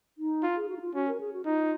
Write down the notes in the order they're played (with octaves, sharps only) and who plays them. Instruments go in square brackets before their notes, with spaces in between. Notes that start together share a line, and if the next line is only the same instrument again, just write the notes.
[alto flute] D#4
[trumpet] F4
[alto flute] G#4
F#4
D#4
F4
[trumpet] C#4 [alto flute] F#4
[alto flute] A#4
G#4
F#4
[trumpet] D#4 [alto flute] F4